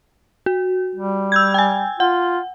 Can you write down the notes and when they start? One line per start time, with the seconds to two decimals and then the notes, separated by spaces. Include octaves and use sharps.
0.46 F#4
0.95 G3
1.32 E6 G6 G#6
1.54 G5 G#5
2.00 F4 F#5